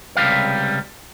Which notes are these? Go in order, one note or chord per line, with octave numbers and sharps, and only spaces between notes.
C#2 C3 D#3 G3 F5